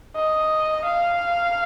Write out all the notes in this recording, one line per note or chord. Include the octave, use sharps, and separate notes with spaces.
D#5
F5